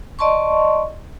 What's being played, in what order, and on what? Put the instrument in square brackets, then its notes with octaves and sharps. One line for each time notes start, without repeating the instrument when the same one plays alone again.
[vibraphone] D5 D#5 A5 C6 C#6